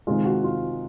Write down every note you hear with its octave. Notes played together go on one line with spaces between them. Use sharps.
C3 D#3 G#3 F4
F#4
F4